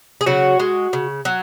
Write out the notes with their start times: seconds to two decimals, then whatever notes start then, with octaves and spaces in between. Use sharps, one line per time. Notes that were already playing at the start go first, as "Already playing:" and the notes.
0.21 G#4
0.26 C#3 F#3 F#4
0.60 G#3
0.93 C#3
1.25 F#3